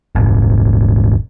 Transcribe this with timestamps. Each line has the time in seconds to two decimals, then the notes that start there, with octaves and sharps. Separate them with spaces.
0.15 D#1 G#1